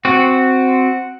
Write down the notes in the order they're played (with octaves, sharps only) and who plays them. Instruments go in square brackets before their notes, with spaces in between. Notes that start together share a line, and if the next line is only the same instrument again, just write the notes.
[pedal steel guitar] C4 F#4 [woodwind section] F#5